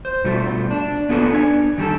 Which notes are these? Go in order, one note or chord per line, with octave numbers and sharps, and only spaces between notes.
C5
B2 G3 A3 F4
D4
B3 C#4 F4 G#4 A4 B4
D4 G#5
D#3 G3 G4 A4